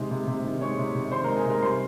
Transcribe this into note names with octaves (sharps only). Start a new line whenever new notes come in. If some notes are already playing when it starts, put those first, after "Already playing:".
Already playing: C3 D#3 G#3
C3
C3
D#3
G#3 C#5 C#6
C3
C3
D#3 C5 C6
A#4 A#5
G#3
G#4 G#5
C3 A#4 A#5
G3 C5 C6